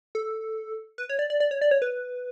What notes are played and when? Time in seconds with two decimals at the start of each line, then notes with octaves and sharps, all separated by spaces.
0.15 A4
0.98 B4
1.09 C#5
1.19 D5
1.30 D5
1.40 D5
1.51 C#5
1.61 D5
1.71 C#5
1.82 B4